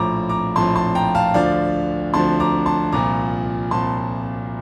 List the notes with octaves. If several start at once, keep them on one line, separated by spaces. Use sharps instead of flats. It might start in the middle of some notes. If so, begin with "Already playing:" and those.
Already playing: A#1 A2 F3 A#5 D6
A#5 D6
A#1 A2 F3 A5 C6
A5 C6
G5 A#5
F5 A5
D2 D3 F3 D5 F5
D2 D3 F3 A5 C6
A#5 D6
A5 C6
C2 A#2 F3 A#5 D6
C2 A#2 F3 A5 C6